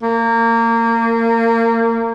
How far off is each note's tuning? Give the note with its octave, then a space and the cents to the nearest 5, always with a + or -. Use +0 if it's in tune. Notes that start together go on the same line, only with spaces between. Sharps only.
A#3 -25